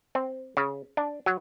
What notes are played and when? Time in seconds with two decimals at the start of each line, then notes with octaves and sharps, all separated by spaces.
0.15 C4
0.57 C#3
0.97 D4
1.26 F#3